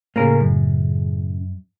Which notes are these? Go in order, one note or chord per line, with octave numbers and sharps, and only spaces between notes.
A2 C#3 A#3 C#4 A#4
F#2